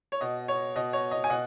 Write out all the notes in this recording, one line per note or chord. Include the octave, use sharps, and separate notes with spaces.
C#5
B2 D#5
C#5
B2 D#5
C#5
D#5
G#5
B2 D#5 F#5